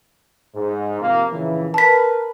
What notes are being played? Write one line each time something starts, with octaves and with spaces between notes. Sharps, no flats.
G#2
C3 F3 A#3
A#1 C#3 E3
A#4 B4 A5 B6